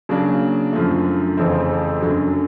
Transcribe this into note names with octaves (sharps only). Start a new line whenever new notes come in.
C#3 F#3 A#3 D4
F#2 D3 F3 A3
F2 C#3 E3 A3 C4
F#2 D3 F#3